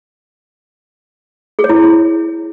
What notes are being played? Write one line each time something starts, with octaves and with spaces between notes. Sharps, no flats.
G#4
C#5
E4